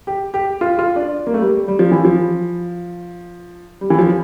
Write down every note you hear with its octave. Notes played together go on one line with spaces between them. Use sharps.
G4
G4
F4
F4
D4
A#3
A3
G3
G3
F3
E3
F3
G3
E3
F3